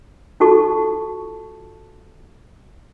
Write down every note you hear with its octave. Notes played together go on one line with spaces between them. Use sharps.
D#4 F4 F#4 A4 A5 C#6